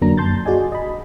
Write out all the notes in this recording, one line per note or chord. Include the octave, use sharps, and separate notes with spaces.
F2 D3 F#3 A#3 D4 A#5
F#2 A5 C6 G6 A6
F#4 G#4 D5 D#5 G#5
D#5 B5